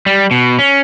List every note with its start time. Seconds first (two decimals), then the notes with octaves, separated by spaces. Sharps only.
0.06 G3
0.31 B2
0.59 C#4